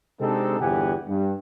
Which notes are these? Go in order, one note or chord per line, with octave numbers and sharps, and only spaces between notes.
C3 G#3 C4 D4 D#4 A4
G1 E2 G4 F#5 G#5
G2